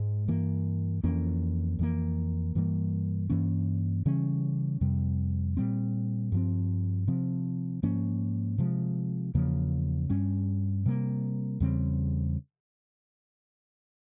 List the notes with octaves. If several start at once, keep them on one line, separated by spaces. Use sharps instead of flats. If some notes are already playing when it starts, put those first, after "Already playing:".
Already playing: G#2 G#3
G2 E3 A#3
F2 E3 A#3 C#4
F2 E3 A#3
G2 E3 G3 A#3
G2 E3 A#3 C#4
C#3 E3 G3 C#4
F2 C3 G3
A#2 G3 C4
G2 F3 C4
C3 F3 C4
G#2 F3 A#3 C#4
C3 F3 G#3
E2 C#3 F3 A#3
G2 G3 C#4
C3 G3 A#3
E2 C#3 G3 C4